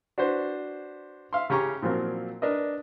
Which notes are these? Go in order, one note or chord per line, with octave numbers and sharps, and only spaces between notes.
D4 F#4 B4 C5
E5 F5 C6
C#3 C#4 G4 A#5 C#6
A#2 F3 F#3 C4 A#4
D4 A#4 B4 D#5